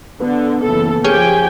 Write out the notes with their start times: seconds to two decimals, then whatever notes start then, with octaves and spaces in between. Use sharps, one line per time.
0.20 D3 B3
0.63 F#1 E3 A4
1.04 F3 C#4 G4 G#4 G5 G#5